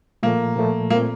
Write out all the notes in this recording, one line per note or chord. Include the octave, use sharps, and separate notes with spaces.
A#2 F3 A3 A#3
A#2 F3 A3
A#2 A3 A#3 C4